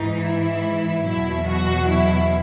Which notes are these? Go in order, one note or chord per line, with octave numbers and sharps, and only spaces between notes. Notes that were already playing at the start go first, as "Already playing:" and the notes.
Already playing: G#2 E3 D#4
E4
E2 B2 F#3 E4
F#4
E4